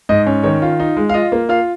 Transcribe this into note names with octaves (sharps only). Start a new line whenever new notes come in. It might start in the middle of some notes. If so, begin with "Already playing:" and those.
G#2 D#5
C#4
D#3 C#5
F4
D#4
G#3
F5
F4 D#5
A#3
F4 F5